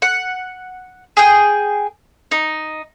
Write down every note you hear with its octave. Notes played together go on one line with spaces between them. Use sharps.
F#5
G#4 G5
D#4